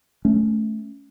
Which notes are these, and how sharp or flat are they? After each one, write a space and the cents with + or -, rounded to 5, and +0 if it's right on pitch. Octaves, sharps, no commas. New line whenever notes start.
A3 -15 C#4 +5